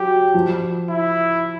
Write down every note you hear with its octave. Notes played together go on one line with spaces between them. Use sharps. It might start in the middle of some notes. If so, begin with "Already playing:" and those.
Already playing: F#3 G4
F3
E4